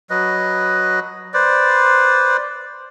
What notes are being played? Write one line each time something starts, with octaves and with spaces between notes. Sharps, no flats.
F#3 B4 D#5
B4 C5 D5